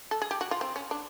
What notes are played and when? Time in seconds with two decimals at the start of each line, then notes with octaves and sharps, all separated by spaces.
0.11 A4
0.22 G#4
0.31 G4
0.41 F#4
0.51 F4
0.61 C4
0.76 C#4
0.91 D4